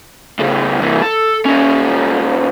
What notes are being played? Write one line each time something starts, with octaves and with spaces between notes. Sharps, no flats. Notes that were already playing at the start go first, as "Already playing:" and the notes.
A2 C#3
C2 E3
A4
A#2 C#4